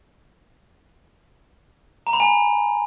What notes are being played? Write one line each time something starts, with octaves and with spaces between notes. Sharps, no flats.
A#5
B5
G#5